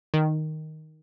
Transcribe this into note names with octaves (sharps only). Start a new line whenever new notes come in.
D#3